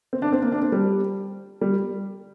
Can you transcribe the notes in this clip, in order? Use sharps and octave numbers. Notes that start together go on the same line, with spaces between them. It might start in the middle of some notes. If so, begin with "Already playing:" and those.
C4
D4
C4
A#3
D4
C4
G3
G3